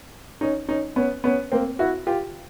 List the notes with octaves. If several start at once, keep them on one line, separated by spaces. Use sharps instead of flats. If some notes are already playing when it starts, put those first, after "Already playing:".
C#4 D#4
C#4 D#4
B3 C#4
B3 C#4
A#3 C4
E4 F#4
F4 G4